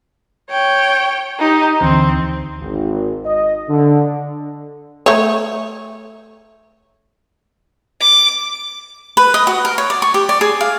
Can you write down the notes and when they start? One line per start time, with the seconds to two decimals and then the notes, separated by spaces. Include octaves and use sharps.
0.50 C#5 G5
1.39 D#4 G4
1.80 D2 D3 E3 C4
2.60 G#1
3.25 D#5
3.69 D3
5.06 A3 C#5
8.00 D6
9.17 B4
9.34 D#5
9.47 F#4
9.65 A#4
9.78 C#5
9.90 D5
10.02 C#6
10.14 G4
10.29 D5
10.41 G#4
10.61 F5